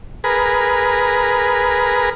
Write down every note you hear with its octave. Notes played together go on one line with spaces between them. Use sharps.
G#4 A#4 B4